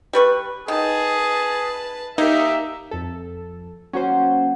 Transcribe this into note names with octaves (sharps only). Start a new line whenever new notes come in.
G3 B4 C#6
D#3 G#4 B4 A5
A#3 D#4 G4 A#4 E5
F2 A4
F#3 A#3 C#4 F#4 C5